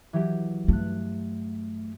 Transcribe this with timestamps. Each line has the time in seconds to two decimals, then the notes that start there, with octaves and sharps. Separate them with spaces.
0.13 E3 F#3 G4
0.68 G2 A3 F#6